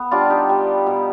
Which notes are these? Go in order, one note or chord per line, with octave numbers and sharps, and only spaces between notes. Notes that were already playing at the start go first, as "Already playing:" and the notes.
Already playing: B3
G3 D4 F4
D#4 G4
G3
B2